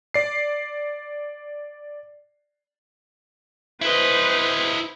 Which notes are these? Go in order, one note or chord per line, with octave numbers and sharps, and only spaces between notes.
D5 C7
E4 B4 C5 D#5